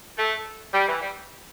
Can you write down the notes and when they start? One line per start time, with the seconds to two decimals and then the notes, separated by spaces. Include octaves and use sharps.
0.18 A3
0.74 G3
0.88 E3
1.01 G3